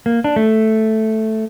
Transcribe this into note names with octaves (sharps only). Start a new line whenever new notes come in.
A#3
D4
A3